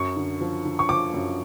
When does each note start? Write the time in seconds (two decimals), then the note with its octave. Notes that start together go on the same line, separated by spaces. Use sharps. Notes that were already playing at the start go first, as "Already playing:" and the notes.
Already playing: F#2 C#6
0.16 D3
0.41 F3
0.65 D3
0.79 C#6
0.89 F3 D6
1.14 F#2